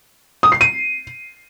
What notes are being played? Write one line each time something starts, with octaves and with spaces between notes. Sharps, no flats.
D#6
C7
D#7